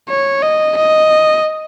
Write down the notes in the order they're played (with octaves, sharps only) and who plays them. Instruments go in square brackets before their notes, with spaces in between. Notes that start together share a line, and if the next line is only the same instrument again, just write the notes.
[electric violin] C#5
D#5
D#5